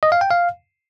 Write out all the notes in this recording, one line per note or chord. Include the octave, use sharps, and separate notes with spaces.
D#5
F5
G5
F5